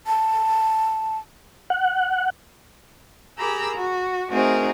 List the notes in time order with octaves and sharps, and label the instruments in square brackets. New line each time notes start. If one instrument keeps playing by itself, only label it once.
[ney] A5
[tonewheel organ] F#5
[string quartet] G4 G#4 A#4 A#5 B5 E6
F#4
A3 C4 D#4 F#4 G#4 A#4